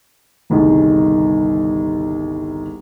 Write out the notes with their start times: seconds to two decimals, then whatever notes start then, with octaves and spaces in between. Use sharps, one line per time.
0.50 G1 C2 D#3 G#4